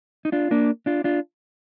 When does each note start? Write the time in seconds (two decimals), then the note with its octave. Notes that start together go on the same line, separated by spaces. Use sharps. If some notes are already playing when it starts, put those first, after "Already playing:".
0.25 D#4
0.32 D4 F4
0.51 A#3 D4
0.86 D4 F4
1.04 D4 F4